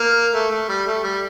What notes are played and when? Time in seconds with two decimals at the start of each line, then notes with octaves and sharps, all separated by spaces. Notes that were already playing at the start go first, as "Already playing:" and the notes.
Already playing: A#3
0.33 A3
0.50 A3
0.68 G3
0.86 A3
1.03 G3